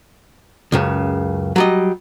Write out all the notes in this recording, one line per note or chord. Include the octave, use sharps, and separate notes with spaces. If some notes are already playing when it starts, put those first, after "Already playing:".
C#2 F#2 C#3
F#3 G3 D#5